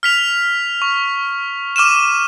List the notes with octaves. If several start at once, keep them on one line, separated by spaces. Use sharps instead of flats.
F6 B6 F7
C#6
D6 F6 D#7 E7